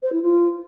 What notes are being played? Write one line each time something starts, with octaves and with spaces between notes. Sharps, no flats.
C5
E4
F4